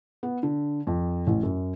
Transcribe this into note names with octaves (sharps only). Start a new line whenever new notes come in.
B3
D3
F2
A1
F#2